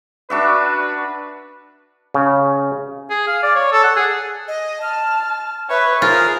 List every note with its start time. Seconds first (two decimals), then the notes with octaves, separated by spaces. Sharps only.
0.30 D4 F#4 B4 E5
2.14 C#3
3.10 G#4
3.28 F5
3.43 D5
3.55 C#5
3.72 A4
3.84 F#5
3.97 G#4
4.48 D#5
4.82 A5 F6
5.70 B4 C#5 E5
6.02 F4 G#4 A#4 C5